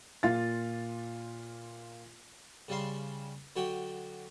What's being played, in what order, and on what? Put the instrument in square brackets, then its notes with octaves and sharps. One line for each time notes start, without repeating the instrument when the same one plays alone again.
[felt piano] A#2 F4 A6
[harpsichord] C#3 G3 E5 F5 C6
D3 F#3 F#4 G4 G5